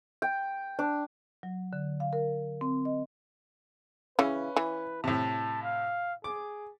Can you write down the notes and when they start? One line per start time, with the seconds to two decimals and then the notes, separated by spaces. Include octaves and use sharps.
0.22 G5
0.79 D4
1.43 F#3
1.73 D3
2.00 F5
2.13 A#4
2.61 C4
2.85 D#5
4.19 C#3 E3 C#4 B4
4.56 E3
5.04 A2 C3 A5
5.63 F5
6.24 G#4 D6